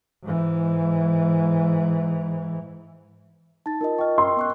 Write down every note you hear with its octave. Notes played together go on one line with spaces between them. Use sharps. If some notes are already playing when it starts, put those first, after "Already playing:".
G#2 E3
D#4 A5 A6
D#4 F4 A#4 D#5
A#4 D#5 G5 C#6 F6
C6 E6
B3 C#6 F#6